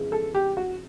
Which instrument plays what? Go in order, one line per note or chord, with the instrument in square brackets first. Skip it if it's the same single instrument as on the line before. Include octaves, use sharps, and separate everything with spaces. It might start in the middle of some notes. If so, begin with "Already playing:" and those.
Already playing: [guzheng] F2 C#3 E3 G#3 B3
[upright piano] A4
G4
F#4